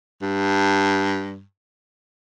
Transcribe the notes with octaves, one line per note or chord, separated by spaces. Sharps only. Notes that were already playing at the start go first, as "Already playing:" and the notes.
G2